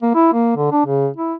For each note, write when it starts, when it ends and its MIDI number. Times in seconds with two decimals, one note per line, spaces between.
0.02 0.12 58
0.15 0.29 64
0.33 0.53 58
0.56 0.70 50
0.72 0.84 62
0.86 1.09 49
1.17 1.34 64